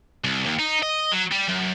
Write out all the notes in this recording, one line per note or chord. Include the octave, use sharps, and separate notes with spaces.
C2
D#2
D#4
D#5
F#3
G3
F#2